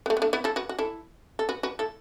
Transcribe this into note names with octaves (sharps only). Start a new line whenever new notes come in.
B3
A3
B3
A3 D4
B3 E4
E4 A4
F#4 B4
F#4
E4 A4
A4
F#4 B4
F#4 B4
E4 A4